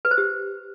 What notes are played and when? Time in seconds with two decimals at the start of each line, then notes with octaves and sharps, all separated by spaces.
0.05 B4
0.11 C5
0.18 G4